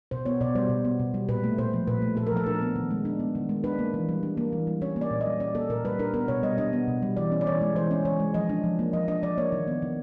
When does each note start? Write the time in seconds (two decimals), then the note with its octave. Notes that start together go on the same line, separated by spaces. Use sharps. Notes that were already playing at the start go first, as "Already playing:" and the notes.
0.11 B2 C5
0.25 B3 C#5
0.41 B2 D5
0.55 G3 C5
0.69 B2
0.85 B3
1.00 B2
1.14 G3
1.28 A#2 B4
1.44 A3
1.58 A#2 C5
1.73 F3
1.87 A#2 B4
2.02 A3
2.17 A#2 A4
2.27 A#4
2.32 F3 A4
2.46 D4 A#4
2.61 B3
2.76 D#3
2.91 G#3
3.05 D4
3.19 B3
3.35 D#3
3.49 G#3
3.64 D4 B4
3.79 A#3
3.94 E3
4.09 G3
4.23 D4
4.37 A#3
4.53 E3
4.67 G3
4.82 C#4 C#5
4.96 A#3
5.01 D5
5.11 A#2
5.21 G3 D#5
5.40 C#4 D5
5.55 A#3 A4
5.70 A#2 A#4
5.85 G3 B4
5.99 D4 A#4
6.14 B3 A#4
6.28 B2 C#5
6.43 G3 D#5
6.58 D4 D#5
6.73 B3
6.88 B2
7.02 G3
7.17 E3 D5
7.32 C#4
7.41 D5
7.46 E3 C#5
7.61 G#3
7.76 E3 C5
7.91 C#4
8.05 E3 C#5
8.20 G#3
8.34 F3 D#5
8.49 D4
8.64 F3
8.79 A#3
8.93 F3 D#5
9.08 D4 D#5
9.22 F3 D5
9.38 A#3 C#5
9.52 D#3
9.68 B3
9.82 D#3